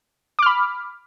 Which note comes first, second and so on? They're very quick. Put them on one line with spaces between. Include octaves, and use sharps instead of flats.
D6 F6 B5